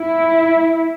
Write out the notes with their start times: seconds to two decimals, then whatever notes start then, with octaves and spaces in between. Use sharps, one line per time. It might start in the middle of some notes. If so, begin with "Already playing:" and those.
Already playing: E4